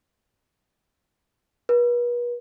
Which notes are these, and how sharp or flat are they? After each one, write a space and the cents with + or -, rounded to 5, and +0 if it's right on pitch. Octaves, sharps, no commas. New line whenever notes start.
B4 -40